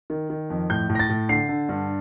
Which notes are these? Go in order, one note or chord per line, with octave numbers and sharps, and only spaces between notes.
D#3
D#3
F2
A2 G6
A2
A#6
A6
A2
D3 C7
D3
G2